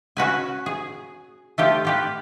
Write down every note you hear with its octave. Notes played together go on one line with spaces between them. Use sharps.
C#4 F#4 B4 G#5
G#4
A3 F4 G4
F4 G4 B4